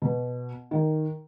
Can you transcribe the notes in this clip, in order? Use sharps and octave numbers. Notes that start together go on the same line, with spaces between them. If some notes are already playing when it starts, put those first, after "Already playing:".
B2
D#3